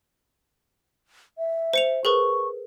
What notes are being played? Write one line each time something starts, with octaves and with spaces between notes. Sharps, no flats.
E5
C5 C#7 F7
G#4 A#4 B4 C#6